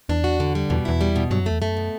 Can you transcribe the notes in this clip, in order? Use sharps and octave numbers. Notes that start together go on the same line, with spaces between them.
E2 D4
F#4
D3
G3
E2 B2
E2 E4
G3
B2
G2 F#3
F#2
E2 A3
F#2 A3
B2